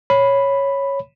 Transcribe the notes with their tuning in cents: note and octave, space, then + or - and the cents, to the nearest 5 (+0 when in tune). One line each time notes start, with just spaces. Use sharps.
C#5 -5 B5 +0